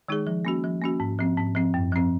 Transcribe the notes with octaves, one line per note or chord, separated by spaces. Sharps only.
D#3 G#3 D#4 G#4
F3
A#3 C#4 F#4
F3
A#3 C#4 F#4
G#2
F3 C4
G#2
F3 C4
F#2
F3 C4